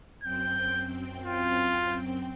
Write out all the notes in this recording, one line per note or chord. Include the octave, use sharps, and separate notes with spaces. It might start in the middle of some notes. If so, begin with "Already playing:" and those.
F#2 C4 G5 G6
F4